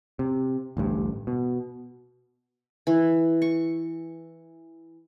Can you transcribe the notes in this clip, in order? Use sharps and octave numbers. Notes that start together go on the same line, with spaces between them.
C3
A1 D2 G2
B2
E3
C#6